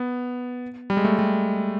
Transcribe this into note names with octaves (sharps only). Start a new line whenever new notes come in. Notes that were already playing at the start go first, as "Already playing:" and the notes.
Already playing: B3
G3
G#3
A3
G3